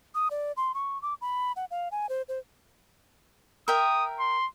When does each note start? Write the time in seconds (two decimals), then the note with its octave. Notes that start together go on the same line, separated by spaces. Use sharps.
0.15 D#6
0.31 D5
0.57 C6
0.74 C#6
1.02 D6
1.21 B5
1.56 F#5
1.71 F5
1.92 G#5
2.09 C5
2.29 C5
3.68 A#4 E5 G5 D#6
4.19 C6